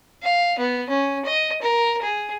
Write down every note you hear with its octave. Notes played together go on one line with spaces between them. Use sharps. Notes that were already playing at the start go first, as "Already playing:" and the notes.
F5
B3
C#4
D#5
A#4
G#4